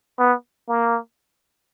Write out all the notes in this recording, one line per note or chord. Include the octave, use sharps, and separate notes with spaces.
B3
A#3